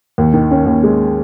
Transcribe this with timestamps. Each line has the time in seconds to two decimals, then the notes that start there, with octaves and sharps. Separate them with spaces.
0.18 D#2
0.34 D#3
0.51 C#4
0.66 D#2
0.83 G#3